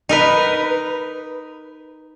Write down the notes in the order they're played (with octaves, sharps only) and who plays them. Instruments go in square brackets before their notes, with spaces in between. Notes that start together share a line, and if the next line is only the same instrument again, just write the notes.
[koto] D#4 A#4 B4